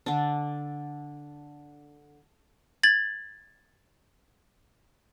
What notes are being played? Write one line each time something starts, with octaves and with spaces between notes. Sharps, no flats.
D3 D4
G#6 A6 F#7